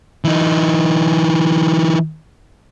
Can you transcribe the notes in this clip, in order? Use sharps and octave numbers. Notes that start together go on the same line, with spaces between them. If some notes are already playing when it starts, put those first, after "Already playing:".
E3 D#4